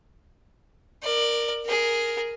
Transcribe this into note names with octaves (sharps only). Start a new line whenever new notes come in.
A#4 D5
G#4 A#4